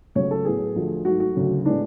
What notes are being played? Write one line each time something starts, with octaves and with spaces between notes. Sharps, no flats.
C#2 C#3 F#3 A3 C#5
A4
A2 F#3 B3 G#4
D2 D3 F3 A3
G#2 F#3 A3 F#4
F#4
D2 C#3 F#3
A2 G#3 B3 D4